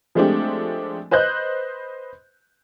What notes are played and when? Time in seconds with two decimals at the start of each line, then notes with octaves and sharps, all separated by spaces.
0.15 F3 G#3 A3 C4 D4 G4
1.11 B4 C5 D#5 F#6 G6